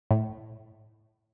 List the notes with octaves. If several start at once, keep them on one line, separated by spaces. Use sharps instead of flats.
A2